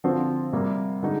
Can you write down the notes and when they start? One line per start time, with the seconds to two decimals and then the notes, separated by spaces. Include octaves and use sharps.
0.04 D3 F3 C4 F4
0.53 C3 G3 A#3
1.03 D3 G#3 D#4